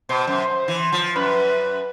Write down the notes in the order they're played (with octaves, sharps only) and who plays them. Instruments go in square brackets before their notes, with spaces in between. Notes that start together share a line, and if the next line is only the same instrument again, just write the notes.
[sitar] B2 [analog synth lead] C5
[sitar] F#2
E3
F3
[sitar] F#2 [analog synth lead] B4